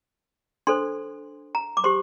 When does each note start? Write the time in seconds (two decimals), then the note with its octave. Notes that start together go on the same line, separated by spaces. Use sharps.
0.67 D4 A4 C5 C6
1.55 A#5
1.77 D6
1.84 G4 C5 C6